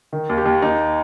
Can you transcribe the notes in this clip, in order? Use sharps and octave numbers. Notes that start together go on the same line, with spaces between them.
D#3
D#2
G4
D#2
D#2 D#4